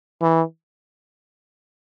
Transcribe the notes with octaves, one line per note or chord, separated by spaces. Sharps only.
E3